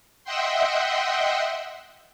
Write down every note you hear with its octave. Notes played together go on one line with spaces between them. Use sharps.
D#5 E5 F#5 G5 C6